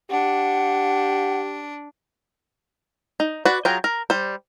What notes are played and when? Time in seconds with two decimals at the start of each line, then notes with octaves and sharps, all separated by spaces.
0.11 D4 G4 F#5
3.20 D#4
3.45 F#4 B4 D5 F#5
3.65 F#3 F4 G#4 G5 A#5
3.84 A#4
4.10 G3 C5